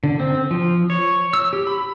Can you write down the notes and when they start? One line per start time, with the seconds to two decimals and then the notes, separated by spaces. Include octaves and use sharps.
0.04 D3
0.20 C4
0.51 F3
0.90 C#5
1.33 E6
1.53 G4
1.67 B5